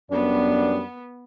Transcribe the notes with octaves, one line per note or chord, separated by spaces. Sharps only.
F#2 G3 B3 D4